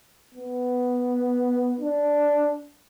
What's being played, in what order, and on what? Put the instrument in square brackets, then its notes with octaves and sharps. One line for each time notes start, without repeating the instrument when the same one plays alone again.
[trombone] B3
D4